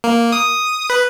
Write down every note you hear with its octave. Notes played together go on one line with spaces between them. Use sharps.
A#3
D#6
B4